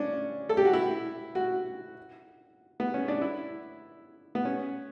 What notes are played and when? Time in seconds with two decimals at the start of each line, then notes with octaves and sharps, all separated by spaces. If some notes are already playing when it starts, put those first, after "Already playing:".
Already playing: C#4 D4
0.49 A4
0.57 G4
0.65 F#4
0.73 E4
1.35 F#4
2.80 B3
2.94 C#4
3.08 D4
3.22 E4
4.35 B3
4.45 C#4